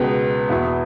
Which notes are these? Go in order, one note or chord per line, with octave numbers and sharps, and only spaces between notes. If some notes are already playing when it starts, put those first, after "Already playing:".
Already playing: C#2 B2 B3
E2 B2 B3 E4